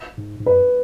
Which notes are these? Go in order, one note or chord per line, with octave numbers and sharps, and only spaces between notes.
G#2
G#2
F#2 B4